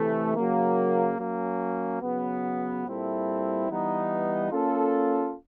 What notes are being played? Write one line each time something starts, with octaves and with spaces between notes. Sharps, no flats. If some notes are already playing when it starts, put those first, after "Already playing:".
Already playing: C3 E3 A3
C#3 F#3 A#3
F#3 A#3 C#4
C#3 F#3 B3
A#2 G3 C4 E4 A4
E3 G3 B3 D#4
A#3 C#4 F4 A4